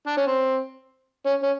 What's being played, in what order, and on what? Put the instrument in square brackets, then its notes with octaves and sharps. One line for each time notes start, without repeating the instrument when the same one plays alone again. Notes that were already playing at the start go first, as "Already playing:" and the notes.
[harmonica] D4
C#4
C4
C#4
C#4